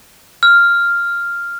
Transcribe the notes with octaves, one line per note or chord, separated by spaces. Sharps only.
F6